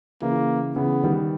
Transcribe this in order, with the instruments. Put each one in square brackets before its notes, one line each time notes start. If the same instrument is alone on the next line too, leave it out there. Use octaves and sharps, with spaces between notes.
[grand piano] C#3 E3 [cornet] A#3
[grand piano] C#3 E3 [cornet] B3
[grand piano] D#3 G3